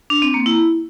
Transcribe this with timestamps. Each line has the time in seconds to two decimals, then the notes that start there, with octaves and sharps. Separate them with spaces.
0.10 D4
0.22 C4
0.34 A#3
0.46 E4